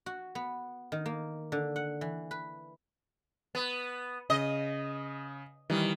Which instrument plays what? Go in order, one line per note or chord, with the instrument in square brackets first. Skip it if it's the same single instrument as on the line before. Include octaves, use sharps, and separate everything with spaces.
[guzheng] F#4
B3
D#3
A#3
D3
F#5
E3
B4
[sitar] B3
[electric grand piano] C#3 [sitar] D#5
[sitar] D#3 [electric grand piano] E3 G3